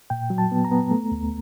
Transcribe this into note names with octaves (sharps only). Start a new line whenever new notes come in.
A#2 G5
F#3
A5
B3
A#5
B3
A3
D2